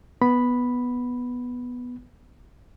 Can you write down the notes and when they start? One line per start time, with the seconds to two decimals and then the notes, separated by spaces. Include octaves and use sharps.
0.21 B3 B5